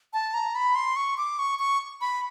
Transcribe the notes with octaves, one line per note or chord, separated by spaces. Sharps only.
A5
A#5
B5
C6
C#6
D6
C#6
C#6
B5